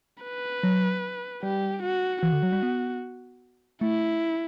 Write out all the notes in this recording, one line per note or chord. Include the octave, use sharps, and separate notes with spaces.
B4
F#3
G3 G4
F#4
E3 F#4
D3
F#3
G3
B3
A3 E4